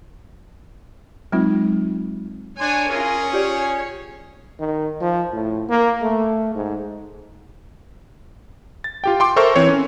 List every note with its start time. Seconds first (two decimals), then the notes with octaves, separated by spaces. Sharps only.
1.32 F#3 G#3 C4 D#4 F4
2.60 D4 C#5 G#5 C6
2.89 C#4 F4 G#4 A#4
3.33 F4 G4 C#5 D5
4.60 D#3
5.01 F3
5.33 A2
5.69 A#3
6.02 A3
6.55 G#2
8.84 A6
9.04 F4 G4 G5
9.20 G5 C6 D6
9.36 A4 A#4 C5 E5 C#6
9.56 E3 C4 C#5
9.69 C#4